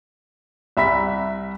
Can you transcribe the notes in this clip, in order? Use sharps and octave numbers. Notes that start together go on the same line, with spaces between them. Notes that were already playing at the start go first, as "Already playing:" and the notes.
C2 E5 B5 B6